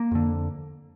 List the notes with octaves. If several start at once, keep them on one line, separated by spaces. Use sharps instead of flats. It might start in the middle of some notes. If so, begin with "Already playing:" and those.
Already playing: A#3
F2 D3